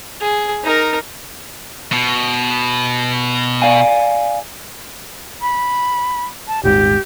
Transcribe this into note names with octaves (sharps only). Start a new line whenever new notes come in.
G#4
D#4 A#4
B2
D5 F5 G#5
B5
A5
D#1 G#1 G#2 G4